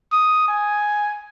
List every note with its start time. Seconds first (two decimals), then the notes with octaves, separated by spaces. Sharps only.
0.12 D#6
0.48 G#5